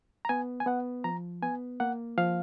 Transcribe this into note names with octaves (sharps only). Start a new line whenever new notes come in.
A#5
B3 G#5
G#5
B3 F#5
F3 A#5
B3 G#5
A#3 F#5
F3 F5